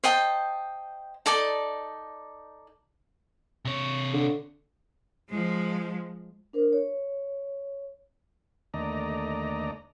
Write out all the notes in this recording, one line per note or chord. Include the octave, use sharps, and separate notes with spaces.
C5 D#5 G5 A5
D#4 A4 D5 A5
C3 C#5
D3
F3 G#3
D4 A#4 C5
C#5
D#2 D3 A3 D5 D#5 A#5